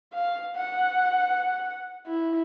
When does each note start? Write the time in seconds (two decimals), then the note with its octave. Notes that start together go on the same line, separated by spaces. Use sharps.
0.14 F5
0.56 F#5
2.06 E4